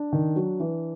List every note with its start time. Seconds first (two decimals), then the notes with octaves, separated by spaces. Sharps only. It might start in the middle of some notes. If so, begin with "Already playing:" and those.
Already playing: D4
0.13 D#3
0.36 F#3
0.60 E3